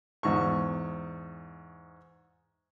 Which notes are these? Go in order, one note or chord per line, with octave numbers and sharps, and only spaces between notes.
E2 G#2 C#6